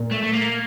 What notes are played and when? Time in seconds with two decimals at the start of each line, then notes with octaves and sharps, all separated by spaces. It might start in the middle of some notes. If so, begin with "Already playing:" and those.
Already playing: A#2
0.11 A3
0.23 A3
0.33 A#3